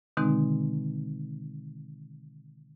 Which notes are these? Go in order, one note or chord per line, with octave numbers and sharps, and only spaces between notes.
B2 D3 D#3 G#3 C4 D#4